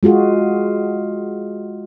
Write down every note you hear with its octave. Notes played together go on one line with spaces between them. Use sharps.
G#3 F4 F#4 G#4